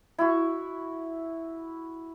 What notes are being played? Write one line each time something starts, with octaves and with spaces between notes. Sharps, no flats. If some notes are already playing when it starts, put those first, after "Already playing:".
E4 F#4